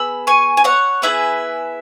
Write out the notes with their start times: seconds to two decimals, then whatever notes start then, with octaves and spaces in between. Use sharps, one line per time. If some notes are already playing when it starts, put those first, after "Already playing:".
Already playing: B3 G#4 B5 E6
0.27 G#5 C#6
0.57 G#5
0.64 C#5 F#5
1.02 B3 E4 G#4 B4 E5